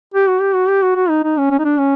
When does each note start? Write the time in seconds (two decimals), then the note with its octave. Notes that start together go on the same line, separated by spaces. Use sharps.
0.14 G4
0.28 F#4
0.41 G4
0.55 F#4
0.68 G4
0.82 F#4
0.96 F#4
1.09 D#4
1.24 D#4
1.38 C#4
1.50 C#4
1.59 D#4
1.65 D4
1.78 C#4